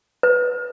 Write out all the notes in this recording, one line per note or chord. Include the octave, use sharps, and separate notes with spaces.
B4